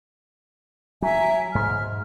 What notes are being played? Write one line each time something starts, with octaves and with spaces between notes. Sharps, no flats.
F#3 E5 G#5 A#5
G#2 F6